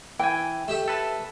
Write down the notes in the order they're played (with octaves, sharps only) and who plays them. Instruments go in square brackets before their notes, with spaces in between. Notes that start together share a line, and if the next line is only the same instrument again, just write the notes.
[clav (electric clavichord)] E3 G#5 [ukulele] G5
[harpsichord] A3 G4 E5
[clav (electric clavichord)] A4 B4 A5